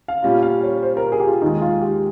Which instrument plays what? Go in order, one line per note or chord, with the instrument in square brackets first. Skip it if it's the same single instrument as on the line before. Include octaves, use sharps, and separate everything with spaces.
[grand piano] F5
[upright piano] A#2 G3 C#4 F4
[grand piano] F5
C#5
C5
A#4
G#4
G4
F4
[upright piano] D#2 D#3 G#3 [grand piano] D#4
[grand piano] F4
G4